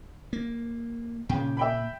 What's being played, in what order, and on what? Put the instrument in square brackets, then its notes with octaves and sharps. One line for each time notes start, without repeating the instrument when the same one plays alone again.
[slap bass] A#3
[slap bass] A#2 [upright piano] C#3 G5
[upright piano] E5 G5 B5